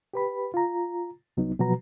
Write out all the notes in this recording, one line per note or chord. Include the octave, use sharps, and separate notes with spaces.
G4 B4 B5
F4 A#5
C2 F#3 B3 D#4
B2 F3 F#3 F#4 B4 A#5